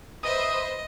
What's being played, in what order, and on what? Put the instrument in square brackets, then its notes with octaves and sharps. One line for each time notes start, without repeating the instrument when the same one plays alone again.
[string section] B4 C5 E5 [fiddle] D#5 [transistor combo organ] D#6